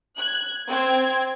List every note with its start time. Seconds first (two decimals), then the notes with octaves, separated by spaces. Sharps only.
0.18 F#6 G#6
0.68 C4 G#6